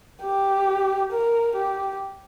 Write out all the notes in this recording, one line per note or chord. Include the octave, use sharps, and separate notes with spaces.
G4
A#4
G4